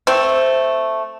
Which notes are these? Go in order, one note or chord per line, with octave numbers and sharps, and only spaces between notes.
A3 C4